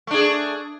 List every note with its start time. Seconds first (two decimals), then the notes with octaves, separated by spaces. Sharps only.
0.07 A3
0.11 D4
0.14 G#4